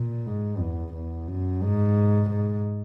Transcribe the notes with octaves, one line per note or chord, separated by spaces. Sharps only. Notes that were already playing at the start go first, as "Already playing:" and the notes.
Already playing: A#2
G#2
E2
E2
F#2
G#2
G#2